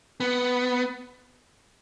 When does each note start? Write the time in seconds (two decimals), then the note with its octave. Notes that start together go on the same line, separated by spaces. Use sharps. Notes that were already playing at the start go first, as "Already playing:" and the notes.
0.20 B3